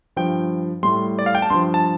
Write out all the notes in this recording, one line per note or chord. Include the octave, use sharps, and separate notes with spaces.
G2 F3 G5
A2 G3 C6
D5
F5
G5
A5
G2 F3 C6
A5